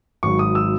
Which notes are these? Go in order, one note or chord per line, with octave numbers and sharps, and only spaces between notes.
G#1 G#2 F#3 C#6
D#6
E6